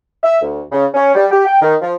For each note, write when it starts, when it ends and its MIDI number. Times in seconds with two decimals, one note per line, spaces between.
0.24 0.39 76
0.42 0.61 38
0.72 0.86 49
0.94 1.14 61
1.15 1.26 55
1.31 1.45 67
1.46 1.61 79
1.62 1.75 51
1.81 1.93 53